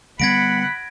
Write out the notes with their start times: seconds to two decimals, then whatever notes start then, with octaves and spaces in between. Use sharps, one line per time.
0.20 D3 G3 B3 F#5 B5 G#6 A#6 D7